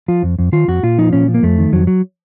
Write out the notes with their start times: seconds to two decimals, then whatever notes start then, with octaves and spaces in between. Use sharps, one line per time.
0.08 F3 F4
0.23 F2
0.39 F2
0.52 D#3 F4
0.68 F2 F#4
0.83 A#2 F4
0.98 F3 D#4
1.13 A#2 C#4
1.28 F3
1.34 A#3
1.43 F2 A3
1.59 D#3
1.72 F2 F#3
1.87 F#3